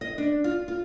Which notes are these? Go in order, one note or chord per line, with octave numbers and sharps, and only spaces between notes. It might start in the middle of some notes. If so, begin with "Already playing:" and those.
D#5
D4
F4
F4